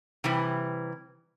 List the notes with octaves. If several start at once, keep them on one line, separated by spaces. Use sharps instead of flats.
C3 E3 G3